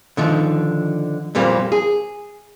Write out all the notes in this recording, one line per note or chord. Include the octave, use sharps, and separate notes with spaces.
D3 D#3 F3
F2 A#2 G3 A#3 C4
G#4